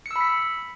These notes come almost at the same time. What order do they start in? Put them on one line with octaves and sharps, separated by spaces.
C#7 E6 B5 B6